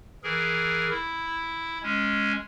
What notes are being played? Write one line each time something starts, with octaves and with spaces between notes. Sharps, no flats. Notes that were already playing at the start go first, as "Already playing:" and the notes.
E3 G#4 A#4
E4
G#3 C#4